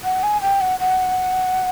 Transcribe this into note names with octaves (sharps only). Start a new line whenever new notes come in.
F#5
G#5
G5
F#5
F#5